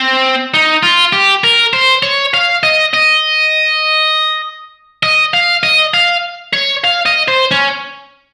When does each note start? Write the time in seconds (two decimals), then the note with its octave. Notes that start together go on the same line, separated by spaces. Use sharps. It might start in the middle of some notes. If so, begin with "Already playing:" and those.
Already playing: C4
0.54 D#4
0.83 F4
1.13 G4
1.44 A#4
1.73 C5
2.03 C#5
2.34 F5
2.63 D#5
2.94 D#5
5.03 D#5
5.34 F5
5.63 D#5
5.94 F5
6.54 C#5
6.84 F5
7.06 D#5
7.28 C5
7.51 C#4